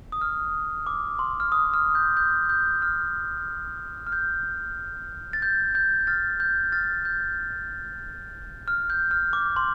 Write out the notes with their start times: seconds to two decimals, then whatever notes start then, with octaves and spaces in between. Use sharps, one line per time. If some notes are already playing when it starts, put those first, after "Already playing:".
0.12 D#6
0.21 F6
0.87 D6
1.19 C6
1.40 F6
1.52 D#6
1.74 F6
1.95 G6
2.17 G6
2.49 G6
2.82 F6
4.07 F6
4.12 G6
5.33 A6
5.42 G6
5.75 G6
6.07 F6 A6
6.40 G6
6.72 F6 A6
7.05 G6
8.68 F6
8.90 G6
9.11 F6
9.33 D6
9.56 C6